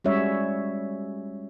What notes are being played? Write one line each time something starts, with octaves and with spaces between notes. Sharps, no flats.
G3 G#3 C#4 F#4 C#5 E5